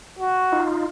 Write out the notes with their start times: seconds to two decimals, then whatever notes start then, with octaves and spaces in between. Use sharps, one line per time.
0.19 F#4
0.52 D#4 F4